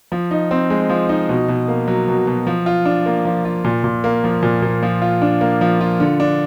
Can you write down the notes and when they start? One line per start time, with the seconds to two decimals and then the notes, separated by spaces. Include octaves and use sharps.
0.12 F3
0.31 D#4
0.51 C4
0.70 G#3
0.89 F3
1.09 D#4
1.29 B2
1.48 B2
1.68 A#3
1.88 F#3
2.08 B2
2.27 B2
2.47 F3
2.66 F4
2.85 D4
3.06 A#3
3.25 F3
3.45 F4
3.65 A#2
3.84 A#2
4.04 A#3
4.24 F3
4.43 A#2
4.62 A#2
4.83 F3
5.02 F4
5.22 D4
5.41 A#3
5.61 F3
5.81 F4
6.00 D3
6.20 D4